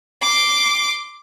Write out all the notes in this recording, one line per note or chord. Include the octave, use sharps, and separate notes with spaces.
C6 D6